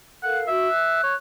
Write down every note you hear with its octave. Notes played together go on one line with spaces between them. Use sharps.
A4 A#4 F5 F#5
F#4 E5
F#6
C#5